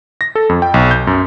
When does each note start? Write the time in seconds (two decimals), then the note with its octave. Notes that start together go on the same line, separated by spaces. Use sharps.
0.21 A#6
0.35 A4
0.49 F2
0.62 G5
0.74 B1
0.91 G6
1.07 F#2